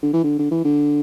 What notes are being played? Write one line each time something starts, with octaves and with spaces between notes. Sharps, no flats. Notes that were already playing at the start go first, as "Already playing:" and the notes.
D3
E3
D3
D3
E3
D3